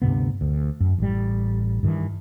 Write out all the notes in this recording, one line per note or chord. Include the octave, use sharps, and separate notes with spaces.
D2 G2 C3 B3
D2
F#2
A1 G3
G2 D#3 E3